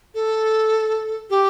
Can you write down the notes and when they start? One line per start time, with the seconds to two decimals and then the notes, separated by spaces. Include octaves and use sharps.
0.14 A4
1.30 G4